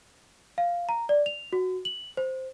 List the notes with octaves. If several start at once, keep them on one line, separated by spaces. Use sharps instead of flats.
F5
A#5
D5
F7
F#4
F#7
C5